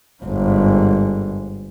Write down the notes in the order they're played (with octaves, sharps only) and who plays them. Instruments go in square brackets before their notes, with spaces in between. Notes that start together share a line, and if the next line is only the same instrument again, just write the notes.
[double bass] G1 G#2